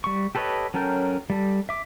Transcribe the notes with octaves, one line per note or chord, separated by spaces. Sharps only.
G3 C#6
G4 A4 B4 C#5 D#5
F#3 C#4 A4 A#4 G5
G3 A4
E5 D6